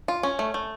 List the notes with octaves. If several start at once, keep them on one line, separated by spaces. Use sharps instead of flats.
F4
C#4
A3
A3